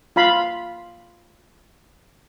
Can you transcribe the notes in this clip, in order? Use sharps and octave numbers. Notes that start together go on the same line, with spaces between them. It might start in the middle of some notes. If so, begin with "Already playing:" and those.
F4 F5 B5 C6